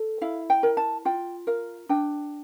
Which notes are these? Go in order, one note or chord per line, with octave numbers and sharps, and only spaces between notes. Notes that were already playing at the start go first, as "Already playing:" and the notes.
Already playing: A4
E4 F5
G5
A#4
A5
F4 G5
A#4 F5
D4 G5